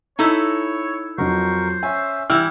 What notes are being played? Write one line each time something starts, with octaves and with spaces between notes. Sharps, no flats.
D#4 E4 A4 C#5
F2 F#3 A#4 C5 C#6
C#4 E5 G#5
E3 G3 E4 E6 F6